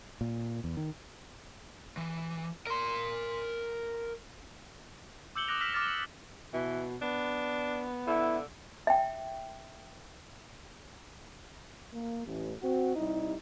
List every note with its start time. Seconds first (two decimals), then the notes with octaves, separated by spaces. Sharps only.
0.21 A#2
0.64 E2
0.77 D#3
1.97 E3
2.67 A#4 C6
5.35 D6 E6 G6 C#7 F#7 G7
5.48 D6 D#6 F#6 A#6 D7 F7
5.61 E6 F6 A#6 B6 E7 G7
5.74 D6 F6 A6
5.88 C#7 F#7
6.54 B2 E3
7.02 B3 D4
8.07 D3 E4
8.87 E5 G5
11.92 A#3
12.25 A1
12.63 C4 F#4
12.96 C3 G3 D#4 E4